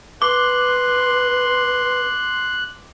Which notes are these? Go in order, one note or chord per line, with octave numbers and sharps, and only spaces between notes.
B4 C6 D6 F#6